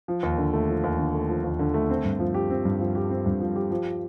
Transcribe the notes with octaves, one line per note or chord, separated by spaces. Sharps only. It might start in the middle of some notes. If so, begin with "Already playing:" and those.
F3
D#2
D3
A3
F3
D#2
D3
A3
F3
D#2
D3
A3
C4
G2
F3
G4
C4
G2
F3
G4
C4
G2
F3
G4
F3